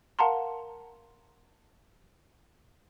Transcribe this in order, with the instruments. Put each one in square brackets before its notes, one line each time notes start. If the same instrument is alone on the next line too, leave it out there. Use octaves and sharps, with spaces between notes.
[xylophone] A#4 F5 F#5 A5 A#5 C6